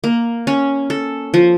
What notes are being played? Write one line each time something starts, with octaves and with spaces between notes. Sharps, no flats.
A#3
C#4
A4
F3